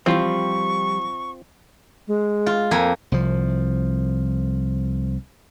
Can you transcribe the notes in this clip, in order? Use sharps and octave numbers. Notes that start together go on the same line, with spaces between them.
E3 F3 G3 C4 F4 C#6
G#3
F4
F2 A#3 G#5
C2 F3